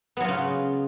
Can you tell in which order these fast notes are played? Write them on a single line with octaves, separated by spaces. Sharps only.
B3 F#3 F4 C#3